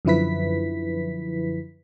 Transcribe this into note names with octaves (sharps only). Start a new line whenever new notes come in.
F#2 D3 F3 E4 B4 B6